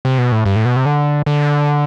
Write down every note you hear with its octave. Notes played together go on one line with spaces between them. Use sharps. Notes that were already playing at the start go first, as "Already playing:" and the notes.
C3
B2
A2
G2
A2
B2
C3
D3
D3